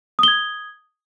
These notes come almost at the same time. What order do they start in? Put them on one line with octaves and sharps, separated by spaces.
D#6 G7 G#6